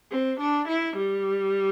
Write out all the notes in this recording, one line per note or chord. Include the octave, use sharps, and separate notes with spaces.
C4
D4
E4
G3